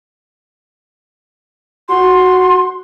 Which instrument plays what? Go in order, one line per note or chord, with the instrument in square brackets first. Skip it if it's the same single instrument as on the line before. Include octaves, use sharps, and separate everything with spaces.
[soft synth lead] F#4 [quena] C6